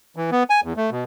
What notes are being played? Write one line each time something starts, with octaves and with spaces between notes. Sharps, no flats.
E3
B3
G#5
E2
A3
B2